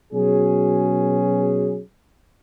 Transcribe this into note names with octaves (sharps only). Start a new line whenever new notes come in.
B2 F#3 C#4 G#4